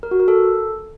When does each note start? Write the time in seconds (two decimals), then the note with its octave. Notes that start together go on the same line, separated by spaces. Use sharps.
0.03 A#4
0.11 F#4
0.20 A#4
0.28 A4